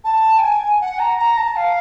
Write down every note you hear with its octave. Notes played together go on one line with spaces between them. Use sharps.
A5
G5
G#5
F#5
A#5
A#5
A5
F5